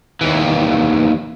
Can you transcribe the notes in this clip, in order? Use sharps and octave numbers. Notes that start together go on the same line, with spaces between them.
D#2 E3